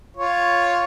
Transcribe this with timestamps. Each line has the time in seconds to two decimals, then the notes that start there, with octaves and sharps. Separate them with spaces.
0.17 F4 C#5